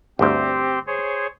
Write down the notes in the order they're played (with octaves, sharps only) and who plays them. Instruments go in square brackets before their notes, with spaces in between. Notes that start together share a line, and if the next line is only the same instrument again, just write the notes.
[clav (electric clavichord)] G1 D2 [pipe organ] C4 G4 C5
[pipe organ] G#4 C5 C#5